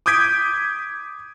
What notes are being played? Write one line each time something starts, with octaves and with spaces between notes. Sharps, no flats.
D6 D#6 G6 G#6 B6 D7